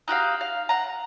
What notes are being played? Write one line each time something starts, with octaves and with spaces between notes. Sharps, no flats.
D#4 F#4 G4 F5
F5
F#5 A#5